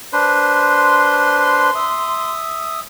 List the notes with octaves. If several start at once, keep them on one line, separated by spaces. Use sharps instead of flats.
D4 B4 C5
C6
E5 D#6